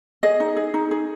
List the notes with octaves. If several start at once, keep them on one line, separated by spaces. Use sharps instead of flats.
G#4 D#5
D#4
G#4
D#4
G#4